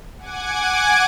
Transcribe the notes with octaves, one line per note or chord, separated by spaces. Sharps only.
F#5 G#5 D6 G#6